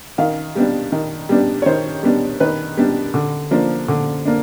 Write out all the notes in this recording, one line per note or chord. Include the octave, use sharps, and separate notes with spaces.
D#3 F5
G3 B3 D4
D#3
G3 B3 D4
C#5
D#3 C5
G3 B3 D4
D#3 B4
G3 B3 D4
D3
F3 A#3 D4
D3
A#3 D4